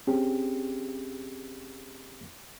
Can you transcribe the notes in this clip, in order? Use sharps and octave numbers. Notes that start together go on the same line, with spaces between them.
C4 C#4 G4 G#4